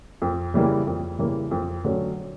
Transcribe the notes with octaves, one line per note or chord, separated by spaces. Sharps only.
F2
C#3 E3 G3 A#3
F2
C#3 E3 G3 A#3
F2
D3 F#3 A3 C#4